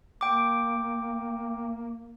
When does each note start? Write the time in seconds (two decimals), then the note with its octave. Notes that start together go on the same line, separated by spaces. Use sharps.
0.21 A#3 G5 D6